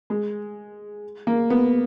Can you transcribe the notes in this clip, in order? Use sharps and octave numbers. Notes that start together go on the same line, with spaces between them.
G#3
A#3
B3